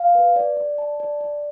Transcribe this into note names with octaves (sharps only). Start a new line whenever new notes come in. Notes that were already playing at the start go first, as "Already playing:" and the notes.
Already playing: F5
B4
D5
D5
A5
D5
D5